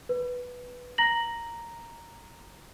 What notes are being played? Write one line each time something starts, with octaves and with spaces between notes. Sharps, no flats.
B4
A#5 A#6 F#7